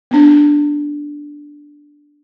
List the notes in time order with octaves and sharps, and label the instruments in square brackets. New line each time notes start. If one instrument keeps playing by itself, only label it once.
[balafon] B3 D4